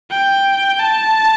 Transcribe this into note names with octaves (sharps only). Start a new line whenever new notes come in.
G5
A5